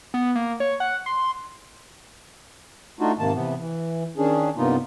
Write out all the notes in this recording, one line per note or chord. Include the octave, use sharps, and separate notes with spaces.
B3
A#3
C#5
F#5
C6
A3 D4 D#4 F4 F#4
G#2 C3 D#3 A#3 A5
C3 E3 B3
E3
D#3 C#4 D4 G#4
G2 C3 A#3 B3 D#4 F4